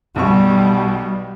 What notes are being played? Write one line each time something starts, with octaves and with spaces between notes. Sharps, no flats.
B1 B2 G3 C#6